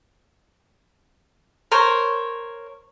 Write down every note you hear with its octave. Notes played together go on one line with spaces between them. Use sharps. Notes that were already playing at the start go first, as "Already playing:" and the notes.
A#4 C5 C#5